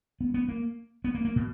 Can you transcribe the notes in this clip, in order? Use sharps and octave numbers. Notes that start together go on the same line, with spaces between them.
B3
B3
A#3
B3
A#3
A#3
B2